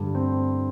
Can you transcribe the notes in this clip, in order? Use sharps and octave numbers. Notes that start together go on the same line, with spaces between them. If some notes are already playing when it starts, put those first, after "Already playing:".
Already playing: G2 D3
C4